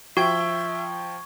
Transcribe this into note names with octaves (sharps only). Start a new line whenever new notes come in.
F3 F#4 E5 G5 C#6 G#6 G7